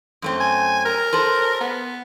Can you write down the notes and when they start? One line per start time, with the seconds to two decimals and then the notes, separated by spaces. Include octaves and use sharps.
0.22 F#2 A3 C4
0.40 G#5
0.85 A#4
1.13 A4 B4 C5
1.61 B3